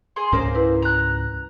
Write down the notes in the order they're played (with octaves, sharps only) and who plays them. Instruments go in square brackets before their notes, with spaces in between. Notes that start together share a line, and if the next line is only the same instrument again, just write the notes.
[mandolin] G#4 C6
[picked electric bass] C#2 G#2 C#4 [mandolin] A#3 C5 A#5
[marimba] E4 B4
[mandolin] A#5 F#6